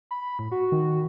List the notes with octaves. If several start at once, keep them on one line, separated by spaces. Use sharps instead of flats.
B5
A2
F#4
D#3